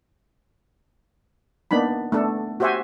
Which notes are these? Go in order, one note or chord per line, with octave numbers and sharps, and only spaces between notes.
A#3 B3 D4 D#4 B5
A3 B3 D4 A4
F#4 G4 C5 E5 F#5 G#5